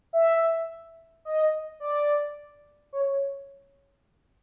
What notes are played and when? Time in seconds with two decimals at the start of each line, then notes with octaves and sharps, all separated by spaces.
0.13 E5
1.25 D#5
1.80 D5
2.93 C#5